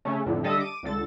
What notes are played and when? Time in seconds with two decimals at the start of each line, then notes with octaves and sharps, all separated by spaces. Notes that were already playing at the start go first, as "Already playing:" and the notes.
0.05 C#3 A3 C#4
0.26 F2 A2 D3
0.43 D3 G3 A4 D#5 E5 D#6
0.60 D6 D#7
0.83 C#2 D3 A4 A6